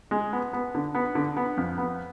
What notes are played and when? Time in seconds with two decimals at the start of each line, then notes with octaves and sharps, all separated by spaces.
0.11 G#3
0.33 B3
0.53 B3
0.75 D3
0.95 B3
1.15 D3
1.37 B3
1.57 F2
1.78 B3